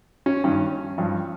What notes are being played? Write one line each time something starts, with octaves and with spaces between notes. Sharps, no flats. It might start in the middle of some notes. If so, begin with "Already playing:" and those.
C#4
G2 D#3 C#4
G2 F3